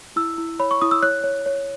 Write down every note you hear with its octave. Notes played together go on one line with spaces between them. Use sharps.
E4 E6
E4
C#5 B5
C#6
E4 D#6
E6
C#5 F#6
C#5
C#5